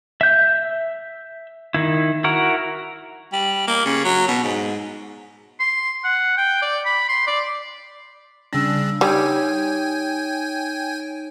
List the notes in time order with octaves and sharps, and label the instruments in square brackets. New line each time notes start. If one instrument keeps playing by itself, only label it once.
[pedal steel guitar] E5 G6
D#3 E4
E4 F#4 A#4
[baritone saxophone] G3
A#3
C#3
F#3
B2
G#2
[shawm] C6
F#5
G5
D5
B5
C6
D5
[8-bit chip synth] C#3 D4 [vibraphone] G3 E6
[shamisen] G3 [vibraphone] D#4 C#5 [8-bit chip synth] G5 G#5